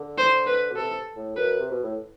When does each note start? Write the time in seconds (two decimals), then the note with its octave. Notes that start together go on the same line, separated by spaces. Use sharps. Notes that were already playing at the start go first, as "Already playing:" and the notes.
Already playing: D3
0.18 C5
0.47 B4
0.71 B2
0.76 C3 A4
1.17 A2
1.36 F#2 B4
1.59 C3
1.71 B2
1.83 A2